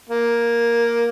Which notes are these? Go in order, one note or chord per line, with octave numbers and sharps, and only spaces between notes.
A#3